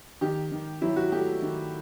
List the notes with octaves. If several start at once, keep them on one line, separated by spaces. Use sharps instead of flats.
D#3 G4
D#3
F#3 E4
F#4
A3 G4
D#3